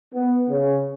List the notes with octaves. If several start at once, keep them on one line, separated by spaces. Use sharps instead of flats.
B3
C#3